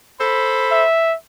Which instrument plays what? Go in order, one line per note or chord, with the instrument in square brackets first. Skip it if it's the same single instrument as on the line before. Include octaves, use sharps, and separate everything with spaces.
[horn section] A4 C5 B5
[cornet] E5